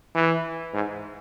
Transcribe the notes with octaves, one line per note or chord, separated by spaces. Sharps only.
E3
G#2